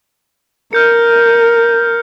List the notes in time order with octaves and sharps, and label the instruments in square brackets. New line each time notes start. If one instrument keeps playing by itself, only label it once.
[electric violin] A#4 [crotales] F6 G6 C#7